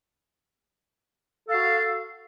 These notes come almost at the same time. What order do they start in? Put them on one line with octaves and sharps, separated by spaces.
A4 F5 F#4